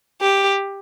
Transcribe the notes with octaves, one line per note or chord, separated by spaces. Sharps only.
G4